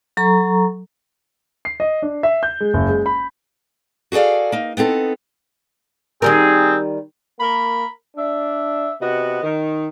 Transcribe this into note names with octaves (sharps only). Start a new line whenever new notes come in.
F#3 A4 A#5 C#6
C7
D#5
D4
E5
G6
G#3
F#1
G#3
B5
F#4 G#4 A4 D5 F5
A#3 D#4
B3 C4 D#4 A4
D#3 G3 C4 G#4 A#4
A#3 A#4 B5
D4 E5
C3 B3 F#4 D#5
D#3